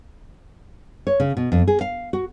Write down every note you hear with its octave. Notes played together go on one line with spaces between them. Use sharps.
C#5
C#3
B2
F2
G#4
F5
F#4